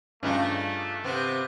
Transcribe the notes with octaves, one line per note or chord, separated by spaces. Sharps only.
G2 C#3 A3 D4 D#4 F4
C3 B3 C4